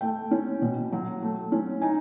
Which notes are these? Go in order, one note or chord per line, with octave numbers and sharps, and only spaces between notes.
A3 G5
C#4
B2
F#3
A3
C#4
D#4 G#5